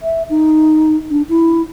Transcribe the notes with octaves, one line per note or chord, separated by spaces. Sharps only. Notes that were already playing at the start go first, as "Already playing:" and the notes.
E5
D#4
D4
E4